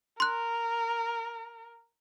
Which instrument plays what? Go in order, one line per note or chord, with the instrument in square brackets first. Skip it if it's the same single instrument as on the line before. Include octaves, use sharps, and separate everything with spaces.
[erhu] A#4 [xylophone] C6 F#6